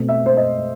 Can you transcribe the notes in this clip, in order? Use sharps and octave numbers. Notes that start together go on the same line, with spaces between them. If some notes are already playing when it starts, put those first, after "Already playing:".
Already playing: B2 A3 C4
E5
C5
D#5